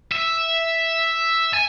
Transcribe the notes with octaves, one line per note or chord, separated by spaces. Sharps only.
E5
G#5